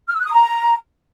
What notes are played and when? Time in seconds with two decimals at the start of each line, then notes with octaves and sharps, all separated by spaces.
0.08 F6
0.14 E6
0.20 F#6
0.26 D#6
0.31 A#5